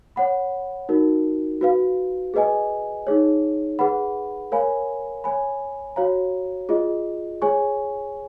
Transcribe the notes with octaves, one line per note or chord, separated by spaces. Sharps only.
C#5 F#5 B5
D#4 F#4 A#4
F#4 B4 F5
G#4 B4 D#5 G#5
D#4 G#4 C#5
G#4 B4 F#5 B5
A#4 C#5 F5 G#5 B5
C#5 G#5 B5
F#4 C#5 F5 A#5
F4 G#4 D#5
G#4 C#5 G#5 C#6